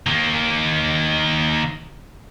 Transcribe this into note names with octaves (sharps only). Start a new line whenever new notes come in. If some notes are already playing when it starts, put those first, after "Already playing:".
D#3 A#3